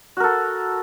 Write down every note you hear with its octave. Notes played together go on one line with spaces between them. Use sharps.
F#4 A4 A#4